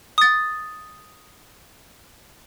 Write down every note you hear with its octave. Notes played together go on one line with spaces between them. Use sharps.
D#6 A6